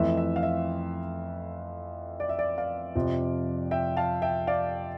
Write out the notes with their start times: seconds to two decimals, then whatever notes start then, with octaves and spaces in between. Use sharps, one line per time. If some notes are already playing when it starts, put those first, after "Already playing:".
Already playing: F2 E3 A3 E5
0.17 E5
0.36 F5
0.43 E5
2.20 D5
2.29 E5
2.39 D5
2.58 D5 F5
2.95 F2 C3 F3
3.71 E5 G5
3.97 F5 A5
4.22 E5 G5
4.47 D5 F5